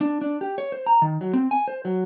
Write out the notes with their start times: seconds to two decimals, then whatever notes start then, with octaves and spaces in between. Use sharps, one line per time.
0.01 D4
0.21 D4
0.41 G4
0.58 C#5
0.72 C5
0.86 A#5
1.02 D#3
1.21 F#3
1.34 C4
1.51 G#5
1.68 C5
1.85 F#3